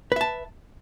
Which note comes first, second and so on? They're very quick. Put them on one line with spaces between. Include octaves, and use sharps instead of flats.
B4 E5 A5